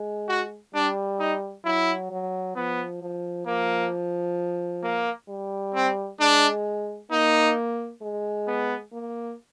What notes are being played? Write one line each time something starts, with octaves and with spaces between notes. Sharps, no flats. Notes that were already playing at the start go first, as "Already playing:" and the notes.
Already playing: G#3
F#4
G3 D4
D#4
F#3 E4
F#3
F3 B3
F3
F3 A#3
A#3
G3
C4
G#3 D4
A#3 D#4
G#3
B3
A#3